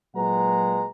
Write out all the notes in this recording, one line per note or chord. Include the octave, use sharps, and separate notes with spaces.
A#2 F#3 G#3 B4 F#5 A#5